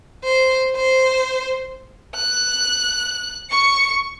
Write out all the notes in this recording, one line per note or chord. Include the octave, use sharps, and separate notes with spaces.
C5
C5
F#6
C#6 C#7